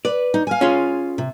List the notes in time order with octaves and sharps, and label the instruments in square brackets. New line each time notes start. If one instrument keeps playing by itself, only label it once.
[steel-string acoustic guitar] B4 [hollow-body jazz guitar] D5
[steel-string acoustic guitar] D#4
F5 G#5
[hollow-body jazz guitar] C#4 F4 G#4
[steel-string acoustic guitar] C3